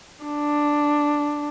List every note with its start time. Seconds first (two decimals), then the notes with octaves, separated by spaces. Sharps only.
0.24 D4